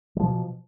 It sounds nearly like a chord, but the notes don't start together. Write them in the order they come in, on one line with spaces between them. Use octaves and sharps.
F#3 F3 B2